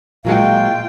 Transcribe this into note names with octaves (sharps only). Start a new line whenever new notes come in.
A#2 F#3 G#3 F4 F5 G5